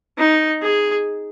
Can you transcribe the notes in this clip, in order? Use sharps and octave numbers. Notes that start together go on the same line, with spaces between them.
D#4
G#4